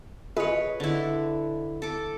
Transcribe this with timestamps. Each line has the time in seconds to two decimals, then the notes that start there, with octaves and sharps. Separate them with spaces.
0.37 F4 G#4 B4 C#5 D#5
0.80 D3 E4
1.82 A4 D6